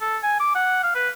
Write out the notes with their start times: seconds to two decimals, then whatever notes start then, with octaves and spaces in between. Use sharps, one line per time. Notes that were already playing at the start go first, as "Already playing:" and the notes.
0.01 A4
0.23 G#5
0.40 D6
0.55 F#5
0.83 F5
0.95 B4